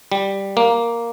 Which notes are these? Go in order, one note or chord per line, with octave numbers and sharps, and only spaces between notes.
G3
A#3